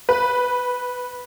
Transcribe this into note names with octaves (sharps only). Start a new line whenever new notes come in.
B4